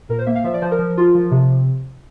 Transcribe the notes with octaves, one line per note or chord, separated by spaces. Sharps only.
A#2 A#4
C5
A#3 E5
F5
F3 E5
D5
F3 C5
A#4
F3
F4
F3
C3